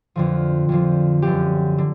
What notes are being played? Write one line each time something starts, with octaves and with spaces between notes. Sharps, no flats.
F2 D3 F3
F2 D3 F3
F#2 D3 F3 G4
D3